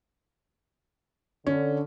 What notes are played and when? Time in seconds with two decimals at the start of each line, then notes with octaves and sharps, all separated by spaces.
1.47 D3 C#4